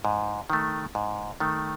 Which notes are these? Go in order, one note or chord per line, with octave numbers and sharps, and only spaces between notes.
G#2
D#3 A3
G#2
D#3 A3